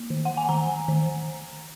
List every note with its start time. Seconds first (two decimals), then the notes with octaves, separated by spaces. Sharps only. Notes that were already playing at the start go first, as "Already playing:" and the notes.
Already playing: A#3
0.10 D#3
0.25 F#5
0.37 G#5
0.49 D#3 A#5
0.88 D#3